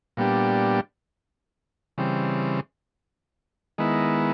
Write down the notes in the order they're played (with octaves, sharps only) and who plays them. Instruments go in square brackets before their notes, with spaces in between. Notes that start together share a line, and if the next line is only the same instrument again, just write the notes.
[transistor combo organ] A#2 G3 B3 D4 G4
C#3 E3 G3 C4
D#3 G#3 B3 E4